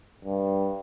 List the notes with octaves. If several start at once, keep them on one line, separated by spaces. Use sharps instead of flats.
G2